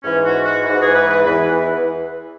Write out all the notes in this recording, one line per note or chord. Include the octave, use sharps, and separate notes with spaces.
G#2 E3 C#4
F#4
F#4
G#2 E3 F#4
G#4
B4
B4
E2 E3 B4